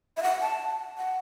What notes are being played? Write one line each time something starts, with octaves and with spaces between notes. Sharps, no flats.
E5
F#5
A5
F#5